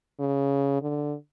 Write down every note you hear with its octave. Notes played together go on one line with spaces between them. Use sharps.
C#3
D3